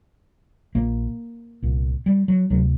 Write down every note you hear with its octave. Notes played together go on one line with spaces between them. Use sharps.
A#1 A#2 A#3
C2 A#2
G3
F#3
D2 C3 F#3